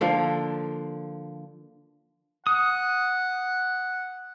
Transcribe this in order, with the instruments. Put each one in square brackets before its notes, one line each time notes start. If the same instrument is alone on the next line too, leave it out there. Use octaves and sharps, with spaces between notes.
[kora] D3 F3 A#3
[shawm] F#5 [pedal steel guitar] D#6